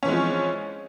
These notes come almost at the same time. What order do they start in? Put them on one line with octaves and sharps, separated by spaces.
C#4 E3 G#3 C4 F3